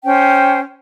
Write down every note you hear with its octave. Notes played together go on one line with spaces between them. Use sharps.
C#4 C5 G5